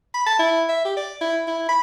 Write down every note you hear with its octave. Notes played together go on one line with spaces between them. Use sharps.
B5
A5
E4
E5
G4
D5
E4
E4
B5